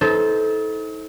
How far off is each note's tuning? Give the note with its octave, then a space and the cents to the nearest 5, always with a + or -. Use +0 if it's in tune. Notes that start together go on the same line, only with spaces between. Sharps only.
D#4 +40 A4 -15 C5 +0